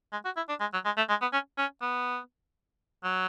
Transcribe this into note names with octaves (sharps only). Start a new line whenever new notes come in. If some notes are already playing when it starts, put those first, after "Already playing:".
G#3
F#4
E4
D4
G#3
F#3
G#3
A3
G#3
B3
C#4
C#4
B3
F#3